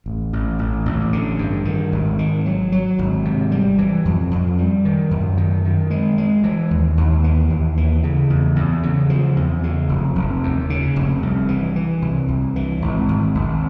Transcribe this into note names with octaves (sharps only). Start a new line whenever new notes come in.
A1
A1
A1
A1
D3
G2
D#3
G#1
D#3
F#3
F#3
G#1
C3
G3
E3
F2
F2
G3
D#3
F#2
D#3
D#3
G#3
G#3
E3
D#2
D#2
E3
D#2
E3
C#3
E2
E2
C#3
F3
E2
C#3
F1
F1
D#2
C#3
F1
C2
E3
E3
C2
C2
E3
G#1
G#1
G#1